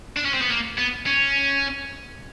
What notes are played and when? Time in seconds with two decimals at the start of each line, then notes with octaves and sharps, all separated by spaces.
0.17 D4
0.25 C#4
0.34 C4
0.42 B3
0.50 A#3
0.78 B3
1.06 C#4